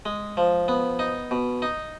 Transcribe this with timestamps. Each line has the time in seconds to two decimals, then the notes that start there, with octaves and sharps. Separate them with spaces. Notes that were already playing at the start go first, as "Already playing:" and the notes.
0.06 G#3
0.37 F3
0.68 B3
0.99 D#4
1.31 B2
1.62 D#4